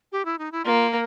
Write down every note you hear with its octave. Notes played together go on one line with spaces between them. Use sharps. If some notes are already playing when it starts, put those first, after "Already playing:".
G4
E4
D#4
E4
A#3 F4
A#4